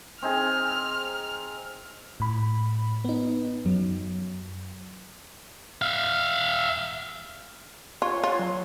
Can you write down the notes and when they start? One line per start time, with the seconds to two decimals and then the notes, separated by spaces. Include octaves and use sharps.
0.22 C4 D#4 G#4 F6
2.20 A2 B5
3.05 B3 D#4
3.65 F#2 F#3
5.82 E5 F5
8.02 F4 C#5
8.24 F4
8.39 F#3